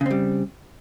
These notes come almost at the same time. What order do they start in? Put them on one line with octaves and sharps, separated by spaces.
C#3 C4 G3